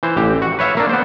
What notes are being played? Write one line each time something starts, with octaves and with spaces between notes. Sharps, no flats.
E3 C5
A1 G4
F#4
B4 C#5 E5 F5
A#3 D4
B3 C5